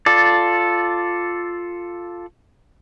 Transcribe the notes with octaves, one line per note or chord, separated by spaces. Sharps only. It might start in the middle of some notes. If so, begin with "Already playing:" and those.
F4 A4 D5